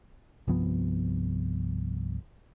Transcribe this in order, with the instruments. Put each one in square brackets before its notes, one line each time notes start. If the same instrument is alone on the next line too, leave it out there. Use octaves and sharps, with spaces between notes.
[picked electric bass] C2 G2 F3 B3